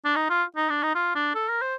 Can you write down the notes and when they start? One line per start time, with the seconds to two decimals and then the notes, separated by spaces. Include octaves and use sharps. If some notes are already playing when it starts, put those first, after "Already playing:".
0.05 D4
0.16 D#4
0.30 F4
0.56 D#4
0.70 D4
0.83 D#4
0.95 F4
1.15 D4
1.35 A4
1.48 A#4
1.62 C5